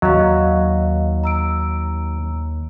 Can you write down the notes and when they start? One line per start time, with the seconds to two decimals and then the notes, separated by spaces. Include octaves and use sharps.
0.02 D#2 D#3 F#3 D#5 F5
1.24 A#5 E6 D7